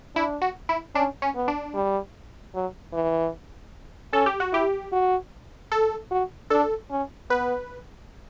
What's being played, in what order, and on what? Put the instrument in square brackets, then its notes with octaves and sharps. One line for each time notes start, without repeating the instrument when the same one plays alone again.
[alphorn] D4 [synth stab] E4
[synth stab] F#4
E4
[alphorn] C#4 [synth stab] D4
[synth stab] C#4
[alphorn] B3
[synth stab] D4
[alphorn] G3
F#3
E3
[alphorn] C#4 [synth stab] A4
[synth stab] G4
F#4
[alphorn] E4 [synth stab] G4
[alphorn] F#4
[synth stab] A4
[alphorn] F#4
[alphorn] D4 [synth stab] A4
[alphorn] C#4
[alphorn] B3 [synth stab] B4